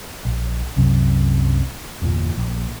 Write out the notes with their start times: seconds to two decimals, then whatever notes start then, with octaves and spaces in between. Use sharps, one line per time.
0.25 A#1
0.76 C2 F#2 C3 F#3
2.02 G1 E2 A#2
2.38 A#1